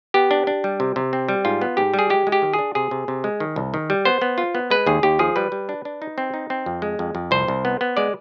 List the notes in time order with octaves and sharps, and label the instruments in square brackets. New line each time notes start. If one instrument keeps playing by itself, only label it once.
[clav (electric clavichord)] B3 G4
D4
D4
G3
C3
C3
C4
G3
G#2 F4
B3
G#2 G4
G3
G#4
G#3 G4
G#3
G4
D#3
G#4
D4
C3 G#4
C3
C3
G#3
D#3
C2
D#3
G3
B3 C5
B3
F4
B3
G#3 B4
D#2 G#4
D#2 G4
F3 G#4
G3 B4
G3
D4
D4
D#4
C4
D#4
C4
F2
G#3
F2
F2
C2 C5
C2
B3
B3
G#3 D5